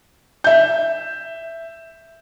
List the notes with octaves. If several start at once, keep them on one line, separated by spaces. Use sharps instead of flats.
E5 G6